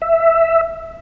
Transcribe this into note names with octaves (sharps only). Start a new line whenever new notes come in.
E5